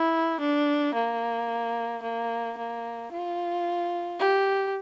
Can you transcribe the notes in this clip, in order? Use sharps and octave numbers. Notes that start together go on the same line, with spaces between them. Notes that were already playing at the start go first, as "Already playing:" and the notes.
Already playing: E4
D4
A#3
A#3
A#3
F4
G4